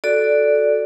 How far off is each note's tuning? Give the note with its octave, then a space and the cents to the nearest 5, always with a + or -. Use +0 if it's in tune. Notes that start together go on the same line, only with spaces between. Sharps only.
F#4 +0 A4 -5 D5 +0